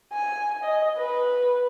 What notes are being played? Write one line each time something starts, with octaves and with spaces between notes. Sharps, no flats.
G#5
D#5
B4